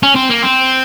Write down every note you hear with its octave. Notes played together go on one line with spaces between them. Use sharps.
C#4
C4
A#3
C4